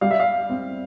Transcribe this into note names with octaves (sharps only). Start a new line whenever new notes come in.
G3 F5
E5
F5
C4